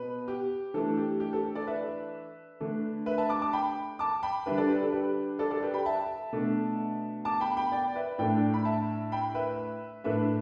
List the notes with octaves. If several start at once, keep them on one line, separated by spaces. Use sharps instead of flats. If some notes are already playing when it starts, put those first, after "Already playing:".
Already playing: B2 B4
G4
E3 A3 D4 A4
G4
G4
A4
A4 D5
B4 E5
D3 A3 D4
B4 E5
E5 A5
A5 D6
A5 D6
G5 B5
A5 D6
G5 B5
D3 G3 D4 B4 E5
A4 D5
G4 B4
A4
G4 B4
A4 D5
A4 D5
G4 B4
G5 B5
E5 A5
B2 A3 D4
A5 D6
G5 B5
G5 B5
D5 G5
B4 E5
A2 A3 D4 D5 G5
B5
E5 A5
G5 B5
B4 E5
A2 A3 D4 B4 E5